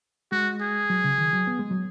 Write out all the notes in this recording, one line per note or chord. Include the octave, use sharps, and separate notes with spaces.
G#3 F#4
G#4
F#3
C#3
D#3
F#3
B3
G#3
F#3